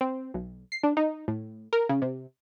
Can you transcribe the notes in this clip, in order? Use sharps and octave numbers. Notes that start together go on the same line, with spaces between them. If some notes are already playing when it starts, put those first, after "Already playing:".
C4
B1
C7
D4
D#4
A2
A#4
C#3
C3